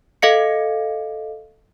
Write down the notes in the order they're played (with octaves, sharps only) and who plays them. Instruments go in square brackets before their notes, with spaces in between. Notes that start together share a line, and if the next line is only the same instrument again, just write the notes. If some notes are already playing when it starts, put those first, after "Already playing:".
[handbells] A4 D#5 F5 C#7